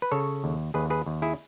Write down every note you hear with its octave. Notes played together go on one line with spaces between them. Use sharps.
B4
C#3 A4 C#5
D#2
D#2 G#4 B4
G#4 B4
D#2
E4 G#4